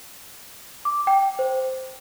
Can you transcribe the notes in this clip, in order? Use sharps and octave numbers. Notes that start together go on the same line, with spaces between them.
D6
G5
C5